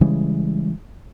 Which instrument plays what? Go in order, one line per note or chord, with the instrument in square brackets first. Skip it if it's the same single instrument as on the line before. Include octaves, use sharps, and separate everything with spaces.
[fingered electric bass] C#3 E3 G3 G#3